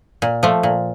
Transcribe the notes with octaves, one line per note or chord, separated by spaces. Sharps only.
A#2
F3 A3
A#2